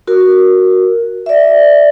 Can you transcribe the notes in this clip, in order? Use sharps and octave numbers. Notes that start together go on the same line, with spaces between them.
F#4 A#4
D5 E5